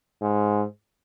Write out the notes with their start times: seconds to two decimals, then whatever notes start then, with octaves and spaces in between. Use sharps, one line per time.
0.21 G#2